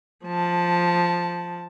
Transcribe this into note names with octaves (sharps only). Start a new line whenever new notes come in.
F3 A5